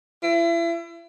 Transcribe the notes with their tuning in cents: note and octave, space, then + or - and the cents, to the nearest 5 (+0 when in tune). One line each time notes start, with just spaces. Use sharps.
E4 +35